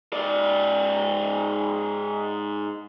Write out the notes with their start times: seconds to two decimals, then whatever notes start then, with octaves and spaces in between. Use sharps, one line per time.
0.13 G#2 D5